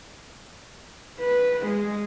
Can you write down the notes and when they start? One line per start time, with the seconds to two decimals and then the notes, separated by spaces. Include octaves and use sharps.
1.20 B4
1.67 G#3